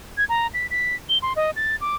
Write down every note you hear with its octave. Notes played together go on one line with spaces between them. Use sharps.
G#6
A#5
B6
B6
G7
C6
D#5
A6
D6